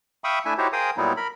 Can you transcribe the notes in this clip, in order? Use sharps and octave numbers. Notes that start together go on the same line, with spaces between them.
E5 F5 G5 B5 C#6 D#6
A3 D4 E4 E5 G#5
D#4 E4 F#4 G4 C5 C#5
G#4 A#4 C5 F5 G5 D#6
A#2 F#3 G3 B3 D#4 E4
A#4 B5